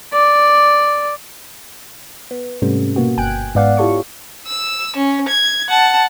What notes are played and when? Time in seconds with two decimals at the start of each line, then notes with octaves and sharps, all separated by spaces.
0.13 D5
2.31 B3
2.62 G#2 C3 G3 A3 B3 C#4
2.96 B2 A#3 B3 F#4
3.17 G1 G5 G#5 F#6 D7
3.55 G#2 B3 D5 F5 F#5
3.77 E4 F4 G4 A4 C#5 C#6
4.47 E6
4.97 C#4
5.28 G#6
5.69 F#5 A5